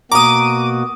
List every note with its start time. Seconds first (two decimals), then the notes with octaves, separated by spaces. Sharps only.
0.12 B2 A#3 F#4 A#5 D6 D#6 D#7